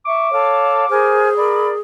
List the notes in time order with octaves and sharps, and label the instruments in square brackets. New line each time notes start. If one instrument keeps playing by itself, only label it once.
[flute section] E5 C#6 [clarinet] D6
[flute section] A4 F5 [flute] C#5
[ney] G#4 [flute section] A#4 G#5 F6 [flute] C5
[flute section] A#4 D5 [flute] B5